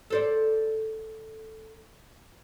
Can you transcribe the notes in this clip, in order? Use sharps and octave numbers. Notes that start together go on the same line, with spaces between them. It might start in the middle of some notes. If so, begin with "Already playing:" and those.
A4 C5 D5